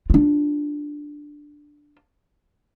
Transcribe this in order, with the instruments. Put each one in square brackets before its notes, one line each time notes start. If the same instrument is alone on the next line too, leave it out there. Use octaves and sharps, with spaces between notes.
[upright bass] D4 F4